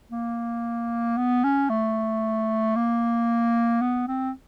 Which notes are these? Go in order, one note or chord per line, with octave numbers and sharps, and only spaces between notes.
A#3
B3
C#4
A3
A#3
B3
C4